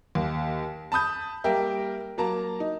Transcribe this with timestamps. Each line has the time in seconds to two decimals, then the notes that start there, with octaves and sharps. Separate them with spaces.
0.15 D#2
0.92 A5 B5 D#6 G6
1.44 G3 A#3 A#4 E5 G5
2.18 F#3 A#3 A5 A#5
2.60 D#4